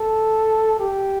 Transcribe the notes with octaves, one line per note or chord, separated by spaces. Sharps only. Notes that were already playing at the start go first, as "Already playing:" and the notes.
Already playing: A4
G4